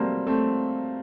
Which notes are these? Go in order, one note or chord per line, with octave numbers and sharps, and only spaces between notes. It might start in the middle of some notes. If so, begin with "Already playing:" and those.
Already playing: F#3 G3 A3 A#3 C4
A3 C4